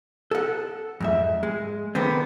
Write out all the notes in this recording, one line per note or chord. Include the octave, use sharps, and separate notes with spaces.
A4 F#5
F2 G#2 E5
G#3
D3 D#3 B3 C4